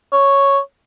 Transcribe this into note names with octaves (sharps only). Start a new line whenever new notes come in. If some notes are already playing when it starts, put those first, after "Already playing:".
C#5